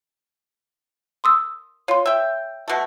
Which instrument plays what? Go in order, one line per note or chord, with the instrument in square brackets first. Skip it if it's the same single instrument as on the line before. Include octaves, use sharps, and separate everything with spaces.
[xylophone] C6 D#6 E6
[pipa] F4 [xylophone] C#5 C6
[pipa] E5 G5
B2 A3